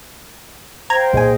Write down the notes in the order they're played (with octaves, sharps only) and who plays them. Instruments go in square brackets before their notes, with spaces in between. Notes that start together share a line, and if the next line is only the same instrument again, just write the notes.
[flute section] C5 F5 G5 [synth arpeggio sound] A#5 G#6
[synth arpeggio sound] C2 G#5 [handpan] A#2 G#4 D#5